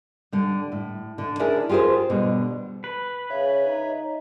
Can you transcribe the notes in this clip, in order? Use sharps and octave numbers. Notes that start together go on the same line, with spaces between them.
D3 G3
A2
D3
C#4 D4 E4 G#4 A#4 D5
F4 G4 G#4 A#4 C5
B2 D3 G3
B4
C#3 C#5 E5
D#4